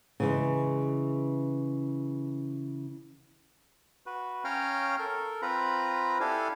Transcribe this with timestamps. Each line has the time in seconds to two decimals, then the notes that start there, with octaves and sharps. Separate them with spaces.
0.20 C#3 E3 G#3
4.06 F#4 B4
4.44 C#4 C#5 F5 G5 A#5 F6
4.99 A4 A#4
5.42 C4 F4 B4 A#5 B5
6.20 D4 E4 G4 A4 F5 G#5